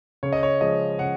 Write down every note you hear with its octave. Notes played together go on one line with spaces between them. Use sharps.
C#3 C#5
D#5
C#5
F3 G#3 D#5
C#3 F#5